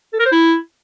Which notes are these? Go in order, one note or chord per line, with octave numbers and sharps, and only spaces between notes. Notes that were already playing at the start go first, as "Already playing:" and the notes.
A4
A#4
C5
E4